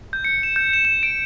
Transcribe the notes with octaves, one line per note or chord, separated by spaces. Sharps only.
G6
C#7
E7
G6
E7
E7
D7